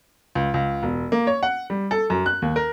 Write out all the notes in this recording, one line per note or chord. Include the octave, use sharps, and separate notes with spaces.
C#2
C#2
E1
A#3
C#5
F#5
G3
A4
F#2
F#6
D#2
A#4